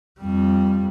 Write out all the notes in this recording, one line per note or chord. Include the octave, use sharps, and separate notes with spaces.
F2 G3